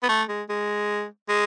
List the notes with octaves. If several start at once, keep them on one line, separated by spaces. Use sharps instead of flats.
B3
A3
G#3
G#3
G#3